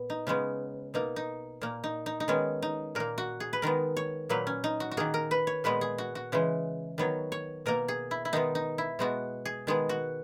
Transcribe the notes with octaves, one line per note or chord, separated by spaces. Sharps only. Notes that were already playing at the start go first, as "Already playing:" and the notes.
Already playing: A#2 B3
D#4
C#3 G#3 B3 C#4
B2 A#3 D#4
D#4
A#2 A#3
D#4
D#4
D#4
D#3 G#3 B3 C#4
D#4
A#2 A#3 A#4
F#4
G#4
B4
D#3 G#3 B3 A#4
C#5
A#2 F#3 A#3 B4
C#4
D#4
F#4
F#4
D#3 A#3 G#4
A#4
B4
C#5
A#2 G#3 B3 B4
G#4
F#4
F#4
C#3 E3 G#3
D#3 F#3 B3 C#5
C#5
B2 A#3 A#4
G#4
E4
E4
D#3 G#3 B3 D#4
D#4
E4
B2 G#3 B3 F#4
G#4
D#3 G#3 B3 G#4
F#4